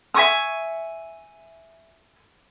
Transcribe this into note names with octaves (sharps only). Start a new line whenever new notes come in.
E5 G#5 C#6 D#6